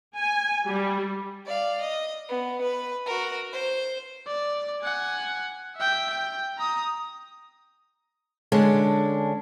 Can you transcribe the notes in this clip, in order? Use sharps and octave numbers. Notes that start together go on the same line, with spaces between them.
G#5
G3
D5 F5
D#5
B3
B4
F#4 A#4
C5
D5
F#5 G#5
E5 G5
G5
A#5 D#6
D3 G#3 C#4 D4